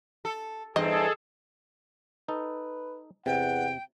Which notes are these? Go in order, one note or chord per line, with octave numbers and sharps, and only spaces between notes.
A4
E2 G2 C4 G#4 A4 D#5
D#4 A4 B4
E2 C3 F#5 G5